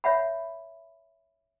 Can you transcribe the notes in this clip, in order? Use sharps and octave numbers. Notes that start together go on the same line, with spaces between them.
C#5 E5 F#5 B5